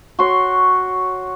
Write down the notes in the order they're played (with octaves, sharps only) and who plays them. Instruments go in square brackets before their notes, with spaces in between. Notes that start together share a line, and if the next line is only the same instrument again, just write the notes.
[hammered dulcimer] F#4 C#5 C6